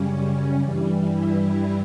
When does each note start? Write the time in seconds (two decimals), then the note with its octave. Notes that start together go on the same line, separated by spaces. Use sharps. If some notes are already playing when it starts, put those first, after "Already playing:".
Already playing: F#2 C#3 G3 C#4
0.11 C#4
0.62 G2 E3 G3
1.12 E4